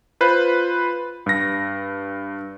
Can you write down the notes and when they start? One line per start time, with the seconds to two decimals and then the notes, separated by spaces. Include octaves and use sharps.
0.21 F4 B4 C5
1.26 G2 A#6